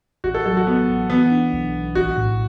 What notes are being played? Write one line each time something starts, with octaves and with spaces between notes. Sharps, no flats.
A1 F#4
A4
F#3 A4
F#4
A1 B3
A1
E3 B3
D4
B1
B1
A1 F#4
A2